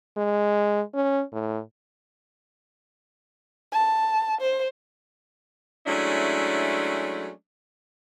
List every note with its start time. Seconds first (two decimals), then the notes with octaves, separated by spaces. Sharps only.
0.17 G#3
0.94 C#4
1.32 A2
3.72 A5
4.41 C5
5.87 F#3 G#3 A3 C#4 D4 E4